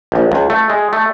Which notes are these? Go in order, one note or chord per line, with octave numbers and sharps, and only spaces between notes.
A#1
C#2
A3
G#3
A3